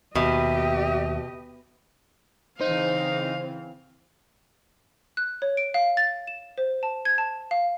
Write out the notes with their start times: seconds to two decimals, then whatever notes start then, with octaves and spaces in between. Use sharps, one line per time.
0.15 D#2 B2 G4 D#5 E5
2.61 C#3 E3 C4 D#4 C5 F5
5.17 F#6
5.42 C#5
5.57 D7
5.74 F5
5.97 A6
6.27 E7
6.58 C5
6.83 A5
7.05 G#6
7.18 A5
7.51 F5